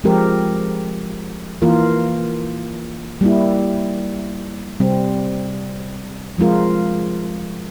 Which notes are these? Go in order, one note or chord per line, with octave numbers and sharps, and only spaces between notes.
F3 G#3 C4 G4 A#4
E3 A#3 F4 A#4
G3 A#3 E4
C3 G3 C4
F3 G#3 C4 F4 A#4